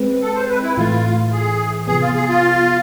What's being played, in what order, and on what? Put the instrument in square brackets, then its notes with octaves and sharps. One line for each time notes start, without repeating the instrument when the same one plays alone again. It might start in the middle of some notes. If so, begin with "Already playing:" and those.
Already playing: [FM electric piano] G#3 C4 B4
[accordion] A4
C5
B4
E4
[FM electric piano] A2 E3 A3 [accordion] F4
[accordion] G#4
[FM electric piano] C3 F3 B3 [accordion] G#4
[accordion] F4
G#4
F4